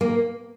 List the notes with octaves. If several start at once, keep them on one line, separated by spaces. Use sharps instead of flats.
A#3